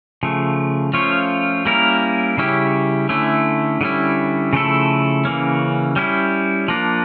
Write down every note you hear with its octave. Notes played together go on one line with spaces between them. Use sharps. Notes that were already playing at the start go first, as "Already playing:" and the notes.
C#3 F3 A3
F3 A3 C#4 F4 C#5
G3 A#3 C#4 E4 A#4
C#3 G3 C#4 E4 G4
D3 A3 C#4 E4
D3 G3 C#4 E4
C#3 F3 A3 E4 A4
C#3 E3 A#3 C#4
G3 C#4 E4
F3 A#3 D4